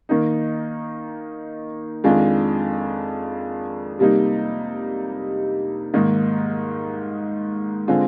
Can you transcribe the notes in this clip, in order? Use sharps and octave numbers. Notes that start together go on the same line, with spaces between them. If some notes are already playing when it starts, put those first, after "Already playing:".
D#3 A#3 D#4
F2 D#3 G#3 D4 F4
C3 G3 A#3 D#4
G#2 D#3 A#3 D#4
D3 G#3 C4 F4